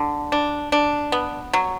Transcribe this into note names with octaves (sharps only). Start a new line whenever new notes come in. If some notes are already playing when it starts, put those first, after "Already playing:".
Already playing: D3
D4
D4
B3
F#3